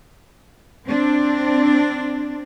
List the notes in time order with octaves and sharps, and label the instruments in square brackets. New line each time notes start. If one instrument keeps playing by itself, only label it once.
[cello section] C4 D4